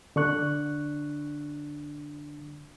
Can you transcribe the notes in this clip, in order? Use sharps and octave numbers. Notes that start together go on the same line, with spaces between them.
D3 D4 C#6 F#6